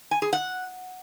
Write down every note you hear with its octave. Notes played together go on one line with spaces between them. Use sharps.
G#5
G#4
F#5